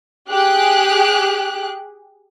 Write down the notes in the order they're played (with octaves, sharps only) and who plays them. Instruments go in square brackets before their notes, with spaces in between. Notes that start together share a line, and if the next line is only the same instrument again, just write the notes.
[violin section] G4 G#4 F#6